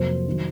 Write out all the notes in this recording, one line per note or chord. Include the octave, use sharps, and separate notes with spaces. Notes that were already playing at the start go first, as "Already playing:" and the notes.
Already playing: F2 C3 F#3 A#3 C5
D#3 F#3